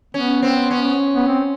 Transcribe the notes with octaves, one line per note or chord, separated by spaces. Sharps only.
B3 C#4
C4
C#4
B3
C4